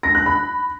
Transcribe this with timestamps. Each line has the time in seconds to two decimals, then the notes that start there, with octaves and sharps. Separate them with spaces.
0.03 A#6
0.15 F#6
0.26 B5